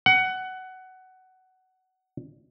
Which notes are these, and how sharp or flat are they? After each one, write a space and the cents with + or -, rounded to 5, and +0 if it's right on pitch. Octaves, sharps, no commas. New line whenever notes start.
F#5 +15